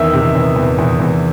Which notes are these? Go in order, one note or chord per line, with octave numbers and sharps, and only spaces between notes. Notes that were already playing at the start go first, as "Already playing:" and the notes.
Already playing: E2 D#3 E5
C3
E2
E2
E2
E2